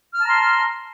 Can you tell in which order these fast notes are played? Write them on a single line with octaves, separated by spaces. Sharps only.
F6 A5 A#5 C6